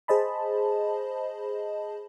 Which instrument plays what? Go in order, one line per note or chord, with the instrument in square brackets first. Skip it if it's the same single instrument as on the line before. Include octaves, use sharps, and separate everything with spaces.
[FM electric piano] G#4 C5 D#5 A5 B5